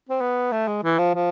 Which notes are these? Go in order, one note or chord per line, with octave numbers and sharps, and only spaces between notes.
C4
B3
A3
G#3
E3
F3
F3